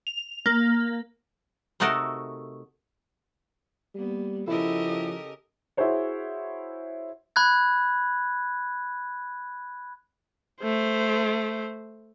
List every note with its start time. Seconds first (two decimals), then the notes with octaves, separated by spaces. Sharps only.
0.07 F7
0.46 A#3
1.80 C3 A3 D#4 F#4 A4 A#4
3.95 G3 A#3 B3
4.48 C#3 F3 E4 G4 A4 A#4 D#5
5.77 E4 F#4 G#4 C5 C#5
7.36 B5 F#6 G#6
10.62 A3 C5